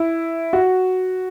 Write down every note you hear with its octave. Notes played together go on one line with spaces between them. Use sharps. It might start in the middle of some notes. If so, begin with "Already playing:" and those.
Already playing: E4
F#4